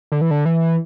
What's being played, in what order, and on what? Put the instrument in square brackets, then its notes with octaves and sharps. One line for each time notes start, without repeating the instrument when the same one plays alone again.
[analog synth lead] D3
E3
D3
E3